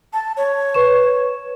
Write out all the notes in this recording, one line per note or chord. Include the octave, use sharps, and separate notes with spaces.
A5
C#5
B4 C#6 E7